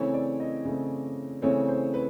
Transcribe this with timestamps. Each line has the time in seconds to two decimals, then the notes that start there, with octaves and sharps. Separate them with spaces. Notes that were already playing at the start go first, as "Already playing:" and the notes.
Already playing: C#3 E3 A3 C4 C#5
0.14 D5
0.40 D#5
0.65 C#3 E3 A3 C4
1.42 C#3 E3 A3 C4 C#5
1.68 C5
1.94 B4